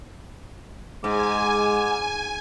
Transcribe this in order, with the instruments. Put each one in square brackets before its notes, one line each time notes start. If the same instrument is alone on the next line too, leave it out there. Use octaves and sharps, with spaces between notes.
[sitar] G#2 [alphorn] G#3 [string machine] G#5 [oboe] D6